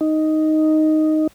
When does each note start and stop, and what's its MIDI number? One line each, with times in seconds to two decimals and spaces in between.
0.01 1.27 63